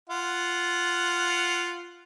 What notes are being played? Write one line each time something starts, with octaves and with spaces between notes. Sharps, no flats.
F4 F#5